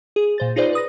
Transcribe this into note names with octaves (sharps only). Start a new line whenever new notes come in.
G#4
A#2 C5 A6
D#4 F4 G#4 B4 C5 D5
B4 D#6 A#6